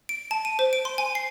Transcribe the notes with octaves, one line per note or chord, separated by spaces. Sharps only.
D7
A5
D#7
C5
D7
C6
G#5
C7